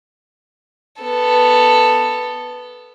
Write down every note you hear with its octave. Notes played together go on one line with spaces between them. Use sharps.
B3 A4